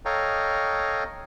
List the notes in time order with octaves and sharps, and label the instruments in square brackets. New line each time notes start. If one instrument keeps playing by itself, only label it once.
[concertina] A4 C#5 D#5 F5 G5 A#5